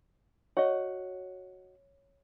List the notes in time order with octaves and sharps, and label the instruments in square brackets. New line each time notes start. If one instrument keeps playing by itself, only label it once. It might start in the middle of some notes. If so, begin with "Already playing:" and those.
[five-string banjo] F#4 D#5 [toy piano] C#5